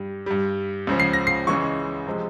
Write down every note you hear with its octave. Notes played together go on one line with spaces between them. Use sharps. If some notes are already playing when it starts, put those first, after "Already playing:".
Already playing: G2 G3
G2 G3
C#2 C#3 F3
C7
A#6
C7
C#2 C#3 E3 G#3 C#6
C3 F3 G#3